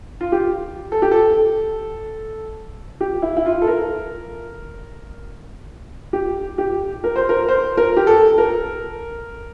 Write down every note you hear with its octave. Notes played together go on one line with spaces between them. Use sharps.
F4
G4
A4
G4
A4
G4
E4
E4
F4
A4
A#4
G4
G4
A#4
C5
A#4
C5
A#4
G4
A4
A#4